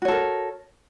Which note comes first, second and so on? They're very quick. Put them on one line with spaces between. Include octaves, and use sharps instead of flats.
F#4 C#5 A4 A#4